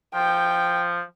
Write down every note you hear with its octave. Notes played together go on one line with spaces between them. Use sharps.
F3 G5